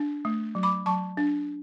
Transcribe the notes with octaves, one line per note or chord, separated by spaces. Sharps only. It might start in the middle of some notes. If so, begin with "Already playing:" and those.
Already playing: D4
A3
F#3
B5 D6
F#3 A5 C#6
D4